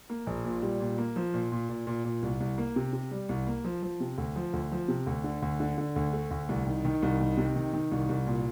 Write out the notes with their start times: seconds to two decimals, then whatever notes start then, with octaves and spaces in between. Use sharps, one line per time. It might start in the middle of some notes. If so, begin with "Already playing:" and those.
0.10 A#3
0.27 A#1
0.45 A#2
0.62 G3
0.80 A#2
0.98 A#3
1.16 F3
1.34 A#2
1.52 A#2
1.69 A#2
1.87 A#2
2.05 A#2
2.22 C2
2.40 C2
2.58 A#3
2.76 C3
2.93 C3
3.11 G3
3.29 C2
3.47 A#3
3.64 F3
3.82 F3
4.00 C3
4.18 D2
4.36 F3
4.53 D2
4.72 F3
4.88 C3
5.06 D2
5.24 D3
5.42 D2
5.60 D3
5.78 D3
5.96 D2
6.13 A3
6.31 D2
6.49 C2
6.66 D#3
6.85 D#3
7.02 C2
7.20 D#3
7.37 C3
7.56 D#3
7.73 D#3
7.91 C2
8.09 C2
8.27 A#2